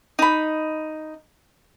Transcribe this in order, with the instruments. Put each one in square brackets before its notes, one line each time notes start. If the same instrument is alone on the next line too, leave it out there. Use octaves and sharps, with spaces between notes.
[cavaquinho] D#4 B5